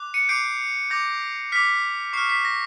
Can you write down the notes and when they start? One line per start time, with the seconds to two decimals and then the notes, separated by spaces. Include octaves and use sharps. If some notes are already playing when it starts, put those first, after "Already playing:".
Already playing: D6 F#6
0.14 C#7 D#7
0.29 D6 G6 C7 D7
0.90 D6 G6 A#6
1.52 D6 F6 B6
2.13 C#6 F6 C7
2.29 B6
2.45 A#6